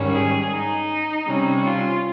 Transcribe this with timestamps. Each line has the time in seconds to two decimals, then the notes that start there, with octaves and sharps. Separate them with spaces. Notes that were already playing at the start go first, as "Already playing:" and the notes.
Already playing: G#2 D#3 G3 C#4
0.14 G#4
0.51 D#4
1.26 C3 G3 C#4
1.64 F4